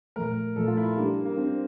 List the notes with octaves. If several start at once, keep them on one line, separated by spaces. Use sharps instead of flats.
A#2 F3 A3 A#4
A#2 F3 A3 A4
F4
E4
G3 A#3 D4 G4
A#3
G3 C4 D4 G4